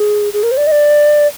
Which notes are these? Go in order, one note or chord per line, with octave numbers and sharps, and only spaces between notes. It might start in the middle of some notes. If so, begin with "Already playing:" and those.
Already playing: G#4
G#4
A#4
C5
D5
D#5
D5